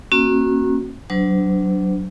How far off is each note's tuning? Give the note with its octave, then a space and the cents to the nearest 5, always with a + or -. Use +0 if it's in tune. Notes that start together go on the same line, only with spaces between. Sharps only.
A#3 +5 C#4 -30 F#4 +0
F#3 +15 D4 -5 C5 -40